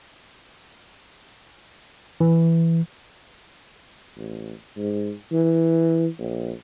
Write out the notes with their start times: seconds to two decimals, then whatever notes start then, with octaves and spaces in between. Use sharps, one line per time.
2.20 E3
4.17 A1
4.77 G#2
5.33 E3
6.19 A#1